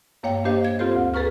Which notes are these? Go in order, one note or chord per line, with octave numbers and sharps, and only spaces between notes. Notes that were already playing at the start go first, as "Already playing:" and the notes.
G2 A#3 C#5 F5 G5
A#3 D4 G4 C5 D#5 F5
F5 G#6
C4 F4 G4 A4 C5
D2
G#4 A4 B4 A#5 C#6 F6